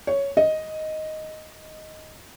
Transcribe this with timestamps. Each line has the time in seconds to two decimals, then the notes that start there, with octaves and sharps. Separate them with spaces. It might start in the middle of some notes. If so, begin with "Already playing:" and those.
0.07 C#5
0.37 D#5